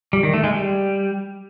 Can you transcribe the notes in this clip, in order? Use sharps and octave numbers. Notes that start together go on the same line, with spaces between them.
G3
D#3
A3
G#3
G3